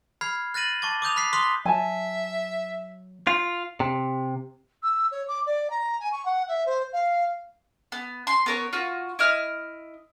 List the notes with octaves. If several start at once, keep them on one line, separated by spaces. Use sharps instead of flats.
B5 F6 G#6 C7
F#6 A6 A#6 D#7 F#7
A5 C#6 D6 A6
D6 D#6 G6 F7
B5 F#6 B6 C7
C6 D#6 F#6 B6 G7
F#3 E5 G#5 A5
F4
C3
E6
C#5
D6
D5
A#5
G#5
C#6
F#5
E5
C5
F5
B3
C6
B3 A#4 C#5
F4 F#4
E4 D#5 F6